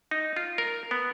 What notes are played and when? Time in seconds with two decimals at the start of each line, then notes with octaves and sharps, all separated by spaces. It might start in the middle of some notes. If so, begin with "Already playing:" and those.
0.11 D#4
0.36 F4
0.58 A#4
0.91 B3